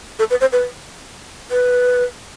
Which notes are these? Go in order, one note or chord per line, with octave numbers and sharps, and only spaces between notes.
A4
B4
C5
B4
B4